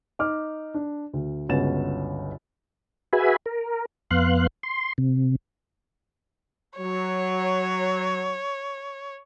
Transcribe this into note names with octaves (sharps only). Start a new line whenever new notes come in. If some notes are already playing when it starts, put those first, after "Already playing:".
D#4 D6 F6
D4
D2
G1 C#2 C#4 F#4 A6 E7
F#4 G#4 B4 E5 G#5 B5
A#4
F2 B3 F5 C6 F#6
C6
C3
F#3 C#5